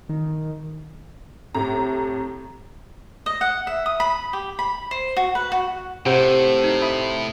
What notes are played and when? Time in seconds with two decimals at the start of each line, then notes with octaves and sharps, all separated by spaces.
0.09 D#3
1.55 A2 C3 A#5
3.26 D#5
3.41 F#5
3.67 E5
3.86 D#6
4.00 B5
4.33 G4
4.59 B5
4.91 C5
5.16 F#4
5.35 B4
5.52 F#4
6.06 A2 C3 F#5 G5 G6
6.64 D#4
6.82 E5 B5 D#6